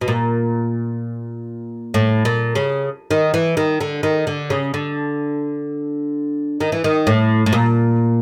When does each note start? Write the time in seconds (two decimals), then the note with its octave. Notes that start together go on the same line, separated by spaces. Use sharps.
0.01 B2
0.08 A#2
1.94 A2
2.25 A#2
2.55 C#3
3.11 D#3
3.34 E3
3.57 D#3
3.81 D3
4.03 D#3
4.27 D3
4.50 C#3
4.74 D3
6.60 D#3
6.72 E3
6.84 D#3
7.07 A2
7.46 A2
7.53 A#2